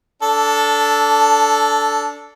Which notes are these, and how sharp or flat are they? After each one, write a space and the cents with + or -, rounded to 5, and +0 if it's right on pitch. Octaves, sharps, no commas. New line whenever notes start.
D4 -20 A4 +0